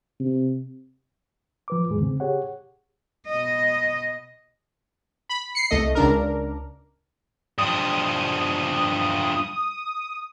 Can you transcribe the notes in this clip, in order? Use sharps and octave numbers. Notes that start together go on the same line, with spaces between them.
C3
F3 B4 D6
E2 A2 D#3 G#3 G#4
C#3 C4
G4 G#4 C#5 F#5
B2 D#5
B5
C7 C#7
C2 A3 D#5
C#2 D4 A#4
G2 F3 D#6